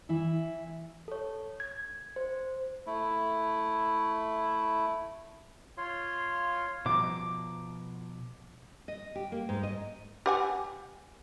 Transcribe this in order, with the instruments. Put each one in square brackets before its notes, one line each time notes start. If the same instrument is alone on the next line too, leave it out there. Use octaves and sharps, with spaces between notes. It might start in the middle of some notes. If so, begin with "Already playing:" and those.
[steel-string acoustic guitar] E3 E4 E5
[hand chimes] A4 C#5
G#6
C5
[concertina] A3 E4
[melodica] F4 C#5 F5 C6
[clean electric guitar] B2 F3 A#5 [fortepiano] D6
[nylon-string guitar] D#5
G4
A#3
G#2
D#5
[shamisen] G4 F#5 G#5